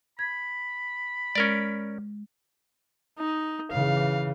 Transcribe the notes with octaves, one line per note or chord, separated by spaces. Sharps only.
B5 G#6
G#3 C#4 A#4 D5
D#4
C#3 E3 F5